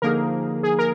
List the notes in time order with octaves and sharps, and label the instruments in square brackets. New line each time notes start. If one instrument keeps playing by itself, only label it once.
[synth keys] D3 F3 A#3 D#4 G#4 [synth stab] A#4
[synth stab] G#4
A#4